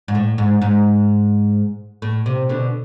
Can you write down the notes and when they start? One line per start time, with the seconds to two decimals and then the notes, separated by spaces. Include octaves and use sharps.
0.08 G#2
0.15 A2
0.38 G#2
0.62 G#2
2.02 A2
2.26 C3
2.49 B2 D3